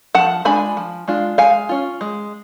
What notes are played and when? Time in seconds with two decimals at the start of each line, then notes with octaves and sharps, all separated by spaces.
0.15 F3 F#5 A5
0.45 G#3 D4 F4 G#5 B5
0.77 F3
1.08 G#3 D4 F4
1.38 G#3 F5 G#5
1.69 C#4 F4
2.01 G#3